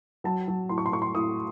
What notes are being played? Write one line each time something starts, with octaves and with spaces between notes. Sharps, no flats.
F#3 A5
F#3
A2 C6
C#6
C6
A2 C#6
C6
A2 D#6